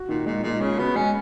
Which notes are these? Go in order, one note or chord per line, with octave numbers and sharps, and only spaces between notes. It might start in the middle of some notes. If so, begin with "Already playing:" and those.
Already playing: F#4
A#2 D#3
A#2 G#3
A#2 G#3
C#3 C#4
B3 F#4
G#3 C#4